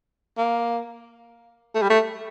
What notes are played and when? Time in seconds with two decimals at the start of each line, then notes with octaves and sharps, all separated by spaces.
0.38 A#3
1.75 A3
1.82 G3
1.90 A3